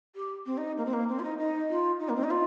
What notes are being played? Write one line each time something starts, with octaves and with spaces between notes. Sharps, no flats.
G4
C4
D#4
A#3
C4
A#3
C4
F4
D#4
D#4
F4
D#4
A#3
C4
D#4
F4